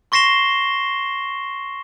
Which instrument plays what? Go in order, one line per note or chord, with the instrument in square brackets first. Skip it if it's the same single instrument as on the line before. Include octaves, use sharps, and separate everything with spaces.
[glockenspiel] C6 C#6 A#6 C7 E7 G7